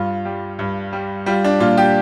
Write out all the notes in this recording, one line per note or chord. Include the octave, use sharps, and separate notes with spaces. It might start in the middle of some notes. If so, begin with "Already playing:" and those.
Already playing: G2 F4
G3
G2
G3
G3 F4
D4
A#2 F4
G4